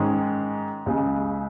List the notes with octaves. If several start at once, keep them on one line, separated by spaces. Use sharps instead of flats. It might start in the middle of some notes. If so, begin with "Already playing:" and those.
Already playing: G#2 D#3 G#3 C#4 G#4
C#2 C#3 G#3